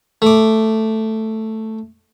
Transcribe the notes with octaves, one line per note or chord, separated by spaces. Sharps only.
A3 D6